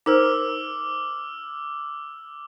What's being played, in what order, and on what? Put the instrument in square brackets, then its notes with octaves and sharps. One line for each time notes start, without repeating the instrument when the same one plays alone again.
[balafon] D#4 A#4 C5 [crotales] D6 E6 F6